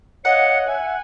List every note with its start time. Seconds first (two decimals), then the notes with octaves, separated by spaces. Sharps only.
0.25 C#5 D#5 F5 F#5 C#7
0.67 E5 G#5